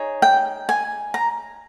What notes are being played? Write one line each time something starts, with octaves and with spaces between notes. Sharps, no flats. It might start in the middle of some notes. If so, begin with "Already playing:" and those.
Already playing: D#4 G#4 C#5
G5
G#5
A#5